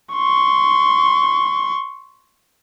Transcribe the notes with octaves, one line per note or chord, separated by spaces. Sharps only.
C6 C#6